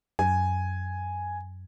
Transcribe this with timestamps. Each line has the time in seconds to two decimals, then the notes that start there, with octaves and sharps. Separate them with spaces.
0.19 F#2 G#5